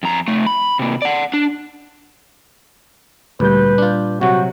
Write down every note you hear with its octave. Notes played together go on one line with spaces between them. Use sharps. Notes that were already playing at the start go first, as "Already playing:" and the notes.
F2 A#5
C3 A3
B5
C3 A#3
D5 F#5
D4
D2 A#2 G3 B4 G6
D4 F4
C3 F#3 F#4